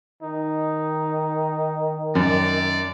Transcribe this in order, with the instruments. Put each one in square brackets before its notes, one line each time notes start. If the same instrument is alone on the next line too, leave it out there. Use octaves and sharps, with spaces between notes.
[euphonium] D#3 [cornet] D#4
[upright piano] F#2 [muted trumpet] D5